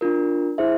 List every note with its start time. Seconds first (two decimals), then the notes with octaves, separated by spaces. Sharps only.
0.01 D4 F4 A#4
0.58 E4 G#4 C5 E5